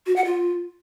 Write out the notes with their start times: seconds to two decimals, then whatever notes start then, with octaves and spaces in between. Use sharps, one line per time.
0.06 F#4
0.16 F#5
0.25 F4